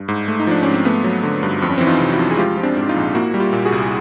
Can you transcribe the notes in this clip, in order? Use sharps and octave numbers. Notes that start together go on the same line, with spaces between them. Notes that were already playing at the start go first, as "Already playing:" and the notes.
Already playing: G2
G#2
A3
D#4
F3 D4
G#2 C#4
C4
A3 B3
F#3
D3
G2
F2 C4
C#4
E3 C4
D#4 F4
C3
E4 F#4
F2
G#4
G#3 F4 G4
F3
C4 D4
G#2
D#4 F4
A#1
A#3 E4 F#4
G3
F4 G4
A#2
F#4 G#4
C2